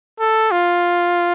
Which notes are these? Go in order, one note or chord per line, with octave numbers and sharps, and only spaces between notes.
A4
F4